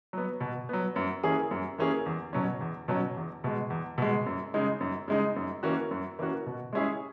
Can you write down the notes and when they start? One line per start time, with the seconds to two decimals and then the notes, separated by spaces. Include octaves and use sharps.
0.13 F#3 B3
0.40 B2
0.69 F#3 B3
0.96 F#2
1.23 E3 A#3 C#4 G#4
1.51 F#2
1.78 E3 A#3 C#4 G#4
2.06 E2
2.33 B2 F#3 C#4
2.61 E2
2.88 B2 F#3 C#4
3.16 E2
3.44 B2 G#3
3.70 E2
3.98 B2 G#3
4.26 F#2
4.54 C#3 G#3 D#4
4.80 F#2
5.08 C#3 G#3 D#4
5.36 F#2
5.63 E3 A#3 C#4 F#4
5.91 F#2
6.19 E3 A#3 C#4 F#4
6.46 B2
6.73 G#3 C#4 E4 G#4